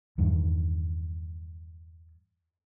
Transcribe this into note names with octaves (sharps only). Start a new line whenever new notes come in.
E2 G2 D#3